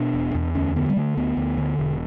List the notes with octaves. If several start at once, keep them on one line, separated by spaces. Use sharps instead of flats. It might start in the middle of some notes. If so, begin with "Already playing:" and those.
Already playing: B2 D4
E1
E2
D2 C#4
D3 B3
G3
D3 A3
D2 B3
D2
D3
E1